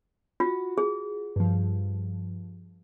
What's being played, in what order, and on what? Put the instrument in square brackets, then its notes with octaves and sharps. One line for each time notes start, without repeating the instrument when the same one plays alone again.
[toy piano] F4 [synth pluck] F#4
[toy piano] G#4
[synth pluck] G2 F3